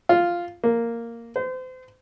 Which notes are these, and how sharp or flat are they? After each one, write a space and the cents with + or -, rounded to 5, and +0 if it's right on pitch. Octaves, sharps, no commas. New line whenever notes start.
F4 -5
A#3 -5
C5 -35